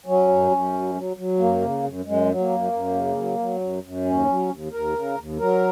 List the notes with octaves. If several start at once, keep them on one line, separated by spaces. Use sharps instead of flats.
F#3 C#4
F#2
F#2
F#3
F#3
F#3
F#2 A#3
C#3
F#2
F#2 G#3
F#3
A#3
F#2
F#2
C#3
F#3
F#3
F#2
F#2
D#2 C#4
F#3
D#2
D#2 A#4
C#3
D#2
F#3 A#4